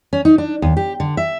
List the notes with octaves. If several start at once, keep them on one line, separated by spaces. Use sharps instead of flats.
C#4
D#4
D4
D#2
G4
D3
E5